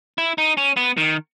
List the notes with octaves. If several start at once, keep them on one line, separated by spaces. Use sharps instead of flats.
E4
D#4
C#4
B3
D#3